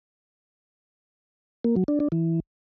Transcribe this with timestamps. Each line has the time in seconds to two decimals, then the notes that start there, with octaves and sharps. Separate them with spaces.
1.64 A#3
1.76 F#3
1.88 D4
2.00 D4
2.12 E3